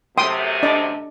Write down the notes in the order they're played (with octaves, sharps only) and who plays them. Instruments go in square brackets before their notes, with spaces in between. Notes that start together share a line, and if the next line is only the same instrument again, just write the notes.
[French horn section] F#2 C3 A3 [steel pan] G5 C6 D#6
[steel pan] D4 D5 D#5